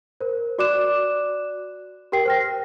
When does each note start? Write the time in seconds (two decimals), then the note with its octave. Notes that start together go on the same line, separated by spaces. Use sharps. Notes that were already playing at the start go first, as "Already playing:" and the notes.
0.21 A#4 C5
0.58 F#4 D5 D6 F#6 E7
2.12 G4 A#4 G5 C7
2.25 C5 F6 A#6